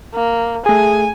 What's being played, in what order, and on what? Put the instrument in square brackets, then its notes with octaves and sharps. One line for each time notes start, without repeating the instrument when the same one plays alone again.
[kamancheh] A#3
[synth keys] A3 G#4 [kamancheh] G#5